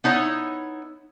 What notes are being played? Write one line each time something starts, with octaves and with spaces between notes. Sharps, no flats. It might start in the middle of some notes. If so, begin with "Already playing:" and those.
B3 D#4 E4 C#5